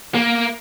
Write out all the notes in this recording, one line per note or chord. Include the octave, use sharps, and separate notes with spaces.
A#3